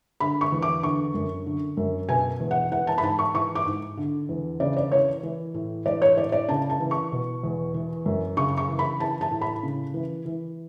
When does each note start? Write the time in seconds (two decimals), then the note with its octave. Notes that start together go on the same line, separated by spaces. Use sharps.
0.20 D3 B5
0.41 C#6
0.52 E2
0.62 D6
0.83 D3 C#6
1.14 F#2
1.46 D3
1.77 F#2
2.09 B2 G#5
2.40 E2
2.51 F#5
2.71 E3 F#5
2.87 A5
2.98 B5
3.03 G#2 A5
3.19 C#6
3.35 E3 C#6
3.55 D6
3.66 G#2
3.98 D3
4.29 E2
4.60 C#3 D5
4.77 D5
4.92 E3 C#5
5.23 E3
5.54 A2
5.86 E3 D5
6.02 C#5
6.17 A2 D5
6.32 D5
6.49 C#3 A5
6.70 A5
6.80 E3
6.91 C#6
7.12 B2
7.44 E2
7.74 E3
8.06 F#2
8.37 C#3 C#6
8.57 C#6
8.69 E3
8.79 B5
9.00 E3 A5
9.21 A5
9.31 A2
9.41 B5
9.63 C#3
9.94 E3
10.26 E3